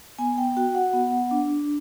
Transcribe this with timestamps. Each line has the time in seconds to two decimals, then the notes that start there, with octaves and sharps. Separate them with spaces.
0.19 B3 G#5
0.38 G5
0.57 F#4 G5
0.75 F#5
0.93 B3
1.31 D4